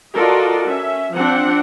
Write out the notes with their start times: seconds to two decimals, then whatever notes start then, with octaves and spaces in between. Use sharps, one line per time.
0.16 F4 F#4 A4 A#4 D5 D#5
0.70 C#4 E5
1.15 F3 C4 D4 F#5